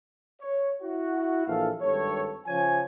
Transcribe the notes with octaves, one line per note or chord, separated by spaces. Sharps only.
C#5
E4 F#4
A#1 E3 A4 F5
G#1 G2 A4 C#5
C#3 F3 C#5 G#5